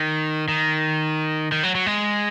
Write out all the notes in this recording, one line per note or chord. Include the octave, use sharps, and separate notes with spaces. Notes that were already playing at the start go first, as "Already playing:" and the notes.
Already playing: D#3
D#3
D#3
F#3
F#3
G#3